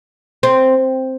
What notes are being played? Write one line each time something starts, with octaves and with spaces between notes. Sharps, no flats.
C4